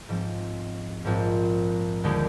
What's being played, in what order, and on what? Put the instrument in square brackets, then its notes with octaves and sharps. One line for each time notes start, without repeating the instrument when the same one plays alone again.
[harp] G#2 F3 C4
A#1 G#2 F3 C4
D#2 D3 G#3 C4 G4